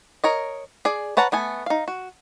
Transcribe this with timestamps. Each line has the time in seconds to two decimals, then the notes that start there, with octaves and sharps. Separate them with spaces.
0.24 A#4 C#5 D#5
0.85 G#4 D5
1.17 B4 C#5 F#5 A5 A#5
1.32 A3 B3 G#5
1.66 D#4 F5
1.88 F#4